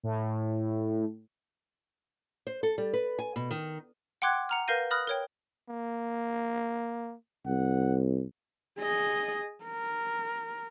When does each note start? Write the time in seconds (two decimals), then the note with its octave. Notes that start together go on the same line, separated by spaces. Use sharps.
0.03 A2
2.47 C5
2.63 A4
2.78 G3
2.93 B4
3.19 G#5
3.36 B2
3.51 D#3
4.22 F#5 G5 C6 D6 F#6 G#6
4.49 F#5 A#5 F6
4.68 A#4 B4 F5 G6 A#6 D#7
4.91 B5 D#6 F6 F#6 A#6
5.07 A#4 C#5 G5
5.69 A#3
7.46 C2 F#5
8.79 G#4 D#5
9.65 A#4